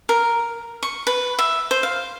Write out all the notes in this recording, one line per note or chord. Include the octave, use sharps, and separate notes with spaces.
A#4
C#6
B4
E5
C5
F5